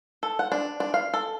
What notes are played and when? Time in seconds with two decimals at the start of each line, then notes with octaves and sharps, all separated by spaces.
0.23 A4
0.39 F#5
0.52 D4
0.80 D4
0.94 F5
1.14 A4